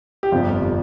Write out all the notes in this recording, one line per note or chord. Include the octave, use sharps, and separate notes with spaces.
G4
G1 F2 C3 F4
C3